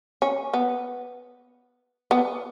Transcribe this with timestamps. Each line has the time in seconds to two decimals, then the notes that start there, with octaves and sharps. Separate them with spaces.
0.22 C#4
0.54 B3
2.11 B3